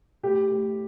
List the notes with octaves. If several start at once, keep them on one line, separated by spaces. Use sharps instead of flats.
A2 G4
A2